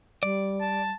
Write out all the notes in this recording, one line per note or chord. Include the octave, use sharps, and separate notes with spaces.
G3 D5
A5